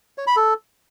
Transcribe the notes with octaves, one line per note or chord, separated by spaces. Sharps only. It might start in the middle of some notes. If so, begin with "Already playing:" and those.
C#5
B5
A4